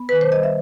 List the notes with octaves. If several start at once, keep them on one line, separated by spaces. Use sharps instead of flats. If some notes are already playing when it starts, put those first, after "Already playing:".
Already playing: B3
D#3 B4
C5
G3 D#5
E5